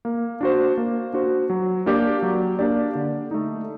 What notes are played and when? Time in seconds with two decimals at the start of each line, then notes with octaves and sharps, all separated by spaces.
0.05 A#3
0.41 D4 F#4 C5
0.77 A#3
1.13 D4 F#4 C5
1.50 F#3
1.86 A#3 D4 G4 D5
2.22 F#3
2.59 A#3 D4 G4 D5
2.95 D3
3.31 A3 D#4